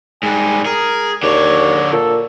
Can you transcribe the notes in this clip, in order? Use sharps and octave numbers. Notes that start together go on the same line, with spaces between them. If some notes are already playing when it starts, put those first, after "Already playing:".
G#2 G3 G#5
G#4 A#4
D#2 D3 C#5 D5
A#2 A4